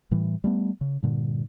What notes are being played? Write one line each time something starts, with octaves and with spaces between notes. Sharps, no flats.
A2 E3 G3
G3 A3 B3
C#3
G2 A#2 D3